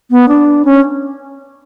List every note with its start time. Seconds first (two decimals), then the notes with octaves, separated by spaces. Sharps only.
0.11 B3
0.28 D4
0.65 C#4